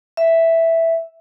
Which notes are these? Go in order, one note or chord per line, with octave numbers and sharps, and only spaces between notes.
E5